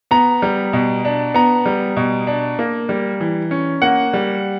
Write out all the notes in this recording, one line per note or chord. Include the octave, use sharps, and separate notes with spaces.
B3 A#5
G3
B2
D4
B3 A#5
G3
B2
D4
A#3
G3
E3
C#4
A#3 F#5
G3